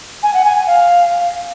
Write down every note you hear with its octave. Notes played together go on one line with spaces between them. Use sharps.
G#5
F#5
G#5
G#5
F5